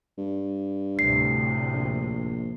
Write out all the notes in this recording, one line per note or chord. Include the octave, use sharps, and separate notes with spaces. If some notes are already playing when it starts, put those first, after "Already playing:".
G2
D2 A2 C3 C7
A#1